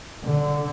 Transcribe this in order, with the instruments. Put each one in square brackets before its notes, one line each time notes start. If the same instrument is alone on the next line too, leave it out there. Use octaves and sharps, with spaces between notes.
[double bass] D3